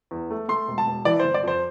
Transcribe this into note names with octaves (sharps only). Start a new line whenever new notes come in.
E2
A3
A3 C6
E1
A5
E1
E3 D5
G1 C5
D5
F2 C5